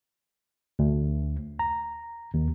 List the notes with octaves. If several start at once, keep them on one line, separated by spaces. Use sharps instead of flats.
D2
A#5
D#2